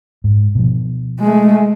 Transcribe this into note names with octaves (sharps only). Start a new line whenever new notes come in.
G#2
B2 F3
G#3 A3